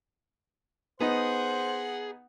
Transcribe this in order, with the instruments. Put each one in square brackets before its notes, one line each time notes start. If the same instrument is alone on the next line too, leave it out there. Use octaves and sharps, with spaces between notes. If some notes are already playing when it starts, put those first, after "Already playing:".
[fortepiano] B3 D#4 [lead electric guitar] G#4 [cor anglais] C5 [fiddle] F#5